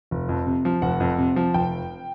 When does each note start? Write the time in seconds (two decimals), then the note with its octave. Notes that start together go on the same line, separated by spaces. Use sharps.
0.11 F1
0.29 F2
0.46 C3
0.65 F3
0.82 F1 F#5
1.00 F2
1.18 C3
1.36 F3
1.54 F1 G5